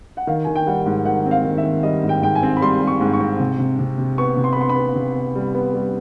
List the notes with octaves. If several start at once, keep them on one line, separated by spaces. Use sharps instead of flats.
F#5
D#3 F5
D#3 G#5
G5
G3 F#5
G#2
D#3 F#5
C4
F5
D#3
E5
D#3
G3 D#5
G#2
G5
G#2 G5
G#5
C4
B5
G3 C6
G3
C#6
G#2
C#6
C4
C3
C3
C3
C3
B3 C#6
C3
C6
B5
B3 C6
B5
B3
C3
B3
G3
B3
G3